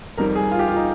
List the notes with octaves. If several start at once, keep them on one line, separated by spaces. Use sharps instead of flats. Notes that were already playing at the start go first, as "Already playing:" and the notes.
F2 D#3 G3 A#4
G#4
F4
G4
F4
D#4